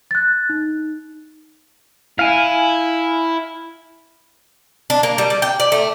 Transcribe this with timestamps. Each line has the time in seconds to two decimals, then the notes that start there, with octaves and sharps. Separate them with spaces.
0.11 F#6 A6
0.49 D#4
2.19 E4 F5 G#5
4.90 D4
5.03 A#3
5.18 G3
5.30 D5
5.42 G5
5.60 D5
5.72 A3